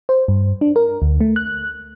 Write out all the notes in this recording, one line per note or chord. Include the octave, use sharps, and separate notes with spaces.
C5
G2
D4
A#4
D2
A3
F#6